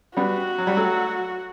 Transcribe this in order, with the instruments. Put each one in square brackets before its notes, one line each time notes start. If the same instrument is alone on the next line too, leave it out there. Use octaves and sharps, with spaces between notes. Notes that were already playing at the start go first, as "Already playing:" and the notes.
[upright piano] G3 B3 [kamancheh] F#4
[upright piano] F#3
G3
F#3 A3